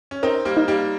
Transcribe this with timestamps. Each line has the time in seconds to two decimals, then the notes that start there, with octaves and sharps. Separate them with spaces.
0.11 C#4
0.23 C4 D#4 A#4
0.45 G3 A#3
0.57 D#4
0.68 G3 A#3